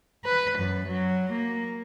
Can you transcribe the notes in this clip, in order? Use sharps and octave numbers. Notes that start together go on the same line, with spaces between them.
B4
F#2
F#3
A#3